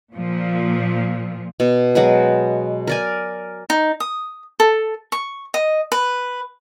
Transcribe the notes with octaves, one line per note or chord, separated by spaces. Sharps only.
A#2 F3
B2
F#3 G#3 B4
A#4 D5 G#5
D#4
D#6
A4
C#6
D#5
B4